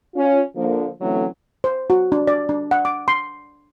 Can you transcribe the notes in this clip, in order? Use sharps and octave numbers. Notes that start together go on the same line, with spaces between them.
C#4 F4
D3 F3 A#3
D3 E3 F#3 A3 C4 C#4
C5
F#4
D4
D5
D4
F#5
D6
C6